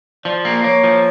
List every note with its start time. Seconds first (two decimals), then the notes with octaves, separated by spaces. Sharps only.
0.25 F3 D5
0.45 A#3
0.64 A#3 C#5
0.84 F3